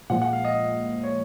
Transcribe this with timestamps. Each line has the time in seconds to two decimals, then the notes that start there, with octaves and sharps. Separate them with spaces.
0.10 A#2 F3 G#3 F#5
0.22 F#5
0.33 F5
0.45 D#5
1.03 C#5